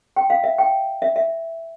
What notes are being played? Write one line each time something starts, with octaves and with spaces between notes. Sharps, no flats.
G5
F5
E5
G5
E5
E5